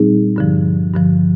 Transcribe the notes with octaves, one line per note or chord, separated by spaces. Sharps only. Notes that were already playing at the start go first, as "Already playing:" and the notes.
Already playing: A#2 G3 C4 D#4 G#4
G2 D3 F3
G2 D3 F3